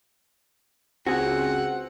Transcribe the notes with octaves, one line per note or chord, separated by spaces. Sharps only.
C#2 C4 F#4 G#4 F#5